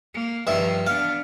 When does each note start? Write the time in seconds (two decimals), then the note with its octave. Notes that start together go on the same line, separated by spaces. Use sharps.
0.14 A#3
0.47 G2 D#3 F3 E5
0.87 B3 D4 F5